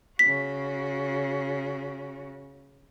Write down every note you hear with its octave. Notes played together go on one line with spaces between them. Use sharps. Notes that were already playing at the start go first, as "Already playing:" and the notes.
C#3 F#4 B6